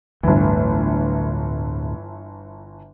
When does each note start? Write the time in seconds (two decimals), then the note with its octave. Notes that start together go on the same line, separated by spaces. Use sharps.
0.23 G1 D2 A2 E3